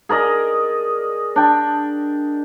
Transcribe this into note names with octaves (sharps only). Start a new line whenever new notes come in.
G#4 A#4 D5 D#5
D4 G5